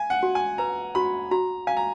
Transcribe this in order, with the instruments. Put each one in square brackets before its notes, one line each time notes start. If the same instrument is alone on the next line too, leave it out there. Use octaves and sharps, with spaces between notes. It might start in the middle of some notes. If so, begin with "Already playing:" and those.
Already playing: [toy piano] F5 [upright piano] G#5
[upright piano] F#5
[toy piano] F#4
[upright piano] G#5
[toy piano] B4 [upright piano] A#5
[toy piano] F#4 [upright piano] B5
[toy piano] F#4 [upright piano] A#5
[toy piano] F5 [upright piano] G#5
[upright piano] A#5